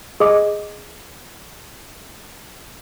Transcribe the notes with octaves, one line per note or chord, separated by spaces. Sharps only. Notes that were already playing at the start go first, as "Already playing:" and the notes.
G#4 D#5 D6